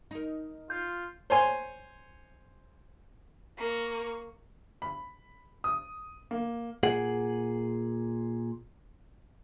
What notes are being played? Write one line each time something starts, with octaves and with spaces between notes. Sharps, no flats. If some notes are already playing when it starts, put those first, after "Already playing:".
D#4 A#4
F4 G6
C5 C#5 G#5 C6
A#3 C#6
B5
D#6
A#3
A#2 G#4 F#5